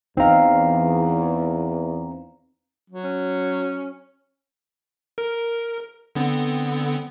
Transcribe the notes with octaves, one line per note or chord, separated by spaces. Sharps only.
E2 C4 D#4 F5 A#5
F#3
C#4
A#4
D3 B3 C4